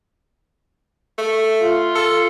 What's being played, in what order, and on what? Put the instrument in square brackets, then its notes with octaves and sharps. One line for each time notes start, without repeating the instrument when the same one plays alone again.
[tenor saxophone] A3
[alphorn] F4
[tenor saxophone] A4